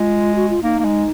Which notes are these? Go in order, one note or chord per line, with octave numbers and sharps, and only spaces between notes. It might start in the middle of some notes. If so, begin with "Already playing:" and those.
Already playing: G#3 F4
F#4
F4
A#3 D#4
A#3
G#3